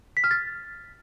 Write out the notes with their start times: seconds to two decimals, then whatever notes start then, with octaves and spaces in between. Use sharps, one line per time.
0.17 B6
0.24 F6
0.31 A6